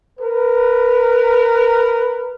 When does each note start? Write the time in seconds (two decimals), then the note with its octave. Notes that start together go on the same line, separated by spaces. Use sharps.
0.18 A#4 B4